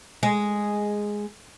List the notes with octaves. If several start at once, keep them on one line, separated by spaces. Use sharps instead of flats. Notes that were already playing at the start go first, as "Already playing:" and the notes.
G#3